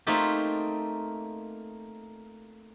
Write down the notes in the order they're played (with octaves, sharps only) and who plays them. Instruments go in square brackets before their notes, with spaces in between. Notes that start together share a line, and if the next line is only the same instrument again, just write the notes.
[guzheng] A3 A#3 C4 D#4 F4 G4